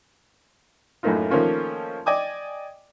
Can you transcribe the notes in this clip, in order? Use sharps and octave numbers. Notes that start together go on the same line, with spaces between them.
F#2 A2 A3 A#3 D#4 F4
D#3 F3 A3 A#3 C#4 F4
D5 D#5 G5 G#5 D6 D#6